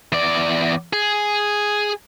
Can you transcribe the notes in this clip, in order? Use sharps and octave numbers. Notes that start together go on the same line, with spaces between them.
E2 D5
G#4